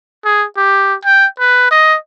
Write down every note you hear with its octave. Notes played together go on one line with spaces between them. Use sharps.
G#4
G4
G5
B4
D#5